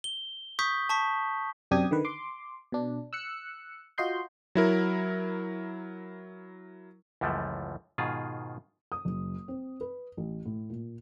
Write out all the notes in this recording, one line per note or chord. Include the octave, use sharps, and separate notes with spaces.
G7
C#6 D#6 G6 B6
A5 C#6 B6
F#2 C3 D4 G4 D#6 G#6
D3 D#3 B4
C6 D6
B2 D4
E6 F#6 C#7
F4 F#4 D#5 C6 G6
F#3 E4 A#4
C#2 F#2 E3 F3 G3 A3
G#2 B2 D#3 F4 G#4
D#6
F#1
C4
B4
A1
A2
A#2